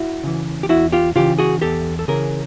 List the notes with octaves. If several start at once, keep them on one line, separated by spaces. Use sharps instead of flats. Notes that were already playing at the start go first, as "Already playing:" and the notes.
Already playing: E4 F#4
C#3 E3
G4
E2 E4 F#4
F4 G4
C#3 E3 F4 G4
F#4 G#4
E2 G4 A4
A4
C#3 E3 G#4 A#4